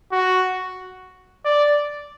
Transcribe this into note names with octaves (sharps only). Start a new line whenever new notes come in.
F#4
D5